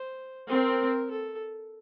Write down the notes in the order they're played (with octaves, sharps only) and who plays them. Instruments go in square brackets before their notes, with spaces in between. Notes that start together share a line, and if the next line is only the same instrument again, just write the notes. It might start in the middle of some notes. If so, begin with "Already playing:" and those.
Already playing: [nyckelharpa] C5
[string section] C4 [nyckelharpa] A#4
[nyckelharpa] A4